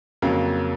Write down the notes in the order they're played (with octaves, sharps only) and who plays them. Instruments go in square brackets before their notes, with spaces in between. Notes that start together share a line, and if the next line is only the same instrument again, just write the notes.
[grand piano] F2 C#3 F#3 A#3